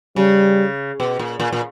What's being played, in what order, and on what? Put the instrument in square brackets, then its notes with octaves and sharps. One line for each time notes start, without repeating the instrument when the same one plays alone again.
[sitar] C#3 [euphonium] G3
[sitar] B2
A#2
A#2
A#2